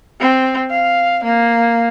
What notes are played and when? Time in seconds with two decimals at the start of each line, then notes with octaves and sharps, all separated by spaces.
0.20 C4
0.71 F5
1.25 A#3